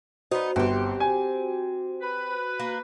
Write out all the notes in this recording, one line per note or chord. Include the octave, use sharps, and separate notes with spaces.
B3 D#4 F#4 C5
G1 C4 G4
G#5
B4
A#3